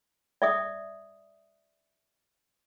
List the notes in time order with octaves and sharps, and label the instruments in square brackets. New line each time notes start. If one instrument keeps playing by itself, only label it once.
[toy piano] D5 E5 D#6